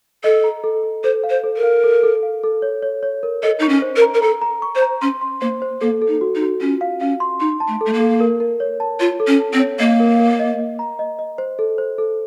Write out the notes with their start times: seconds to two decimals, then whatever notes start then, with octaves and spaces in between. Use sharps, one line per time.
0.24 A4 D#5
0.44 A#5
0.64 A4
0.83 A4
1.04 A4 C5
1.24 F5
1.30 C5
1.44 A4
1.57 A#4
1.63 F5
1.84 A4
2.03 A4
2.23 F5
2.43 A4
2.62 C#5
2.83 C#5
3.03 C#5
3.23 A#4
3.43 A4 D#5
3.59 D#4 C#6
3.69 C#4
3.82 C5
3.96 A#4
4.02 A#5
4.14 A#4
4.22 A4 A#5
4.42 A#5
4.62 C#6
4.76 C5
4.82 A#5
5.02 C#4 C6
5.21 C6
5.41 A#3 C5
5.62 C5
5.81 A#3 A4
6.02 A4
6.08 D#4
6.21 F#4
6.35 D#4
6.41 F#4
6.60 C#4 F4
6.81 F5
7.01 C#4 F5
7.20 C6
7.40 D#4 C6
7.60 A5
7.68 A3
7.81 A3 A4
7.93 A#3
8.00 A4
8.20 A#4
8.40 A#4
8.60 C#5
8.80 A5
9.00 F4 C#5
9.20 A4
9.27 C#4
9.40 A5
9.53 C4
9.59 C#5
9.79 A#3 D#5
10.00 A#4
10.20 A#4
10.40 D#5
10.59 D#5
10.79 A#5
10.99 D#5
11.19 D#5
11.38 C5
11.59 A4
11.78 C5
11.98 A4